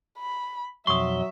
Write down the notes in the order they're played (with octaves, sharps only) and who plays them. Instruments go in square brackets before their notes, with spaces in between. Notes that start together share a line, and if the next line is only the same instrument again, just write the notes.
[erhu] B5
[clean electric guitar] B1 F2 C6 [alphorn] F#3 [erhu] E5 [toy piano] C#6 D#6